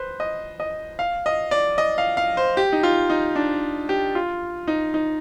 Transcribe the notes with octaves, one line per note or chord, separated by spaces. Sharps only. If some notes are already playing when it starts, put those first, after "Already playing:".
Already playing: B4 C5
D#5
D#5
F5
D#5
D5
D#5
F5
F5
C5
G4
D#4
F4
D#4
D4
G4
F4
D#4
D#4